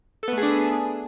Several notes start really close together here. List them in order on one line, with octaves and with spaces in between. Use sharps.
A4 B3 A3 G#4 D4